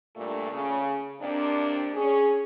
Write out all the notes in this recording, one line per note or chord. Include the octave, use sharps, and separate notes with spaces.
G2 A#2 A3
C#3
F2 C3 A#3 C4 D4
C#4 G#4